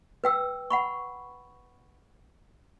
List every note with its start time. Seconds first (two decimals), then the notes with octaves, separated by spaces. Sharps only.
0.24 B4 G5 E6
0.70 F#5 B5 C#6